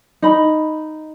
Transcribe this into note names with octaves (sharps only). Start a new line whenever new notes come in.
D#4 B5